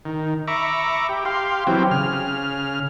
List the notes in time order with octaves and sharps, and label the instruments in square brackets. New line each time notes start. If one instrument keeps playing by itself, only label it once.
[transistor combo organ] D#3
E5 A#5 B5 C#6 D6
G4
G4 F5 C6
E3 F#3 C4 G4
C#3 F6